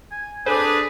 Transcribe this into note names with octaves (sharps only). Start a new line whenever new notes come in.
G#5
D4 G#4 A4 B4 C5 D6